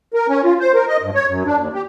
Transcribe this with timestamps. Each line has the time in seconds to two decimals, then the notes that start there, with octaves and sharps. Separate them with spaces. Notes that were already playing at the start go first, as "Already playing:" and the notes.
0.14 A#4
0.29 C#4
0.44 F4
0.60 C5
0.74 A#4
0.88 D#5
1.02 G2
1.14 C#5
1.27 F#2
1.46 D4
1.57 D#2
1.73 G4